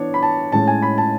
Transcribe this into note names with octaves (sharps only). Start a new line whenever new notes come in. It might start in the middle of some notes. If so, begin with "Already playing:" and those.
Already playing: E3 B3 D4 C#5
B5
A5
A2 G#3 C#4 A5
G#5
B5
A5